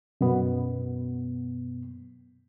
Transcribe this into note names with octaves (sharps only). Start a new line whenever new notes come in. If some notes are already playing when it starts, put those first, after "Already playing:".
F#2 B2 B3